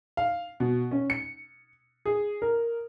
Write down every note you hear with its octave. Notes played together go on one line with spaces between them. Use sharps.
F5
B2
C#4
C#7
G#4
A#4